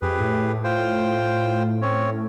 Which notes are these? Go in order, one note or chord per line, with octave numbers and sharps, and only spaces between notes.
F2 G4 G#4 B4
A2
F4 C5 G5
C4 C#4 C#5